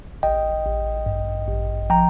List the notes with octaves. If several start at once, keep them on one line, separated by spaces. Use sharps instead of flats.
A1 D#5 G5
A1
G2
A1
F3 G5 A#5